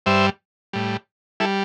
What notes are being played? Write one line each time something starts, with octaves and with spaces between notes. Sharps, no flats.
G2 G3 C5 E5
A2 G3
G3 E4 A4